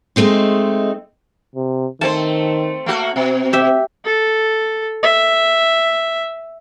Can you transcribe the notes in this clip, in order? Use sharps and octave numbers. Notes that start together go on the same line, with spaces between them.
G#3 A3 C4 D#4
C3
D#3 A3 C4 C5 A5
A3 A#3 F#4
B2 C4
G4 E5
A4
E5